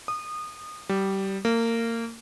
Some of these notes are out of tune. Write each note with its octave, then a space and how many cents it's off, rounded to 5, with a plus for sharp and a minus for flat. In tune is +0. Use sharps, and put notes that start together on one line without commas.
D#6 -25
G3 -20
A#3 -25